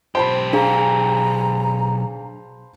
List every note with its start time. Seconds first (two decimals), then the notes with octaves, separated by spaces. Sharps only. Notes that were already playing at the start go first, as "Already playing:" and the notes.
0.15 B1 G4 C5 A5 B5
0.53 D4 G#4 F5 A#5